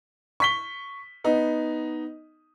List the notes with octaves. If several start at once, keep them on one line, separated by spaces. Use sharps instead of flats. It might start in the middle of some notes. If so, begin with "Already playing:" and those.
C#6 B6 G7
B3 D#4